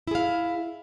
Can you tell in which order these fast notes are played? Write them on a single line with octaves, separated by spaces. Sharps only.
E4 G#4 F5